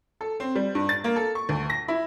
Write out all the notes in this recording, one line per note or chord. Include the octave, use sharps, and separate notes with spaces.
A4
C4
G3
G2
A6
A#3
A4
C#6
D2
A#6
E4